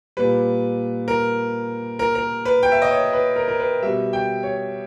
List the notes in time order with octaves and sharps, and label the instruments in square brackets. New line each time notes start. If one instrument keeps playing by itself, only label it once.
[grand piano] A#2 G3 B4
A#4
A#4
A#4
B4
G5
E5
D#5
C#5
B4
A#4
A#4
B4
B2 G3 E5
G5
C#5